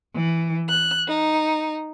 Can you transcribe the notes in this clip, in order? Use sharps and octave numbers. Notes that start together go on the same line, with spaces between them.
E3
F#6
D#4